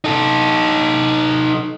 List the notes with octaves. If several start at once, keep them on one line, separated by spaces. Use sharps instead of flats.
D#4 A4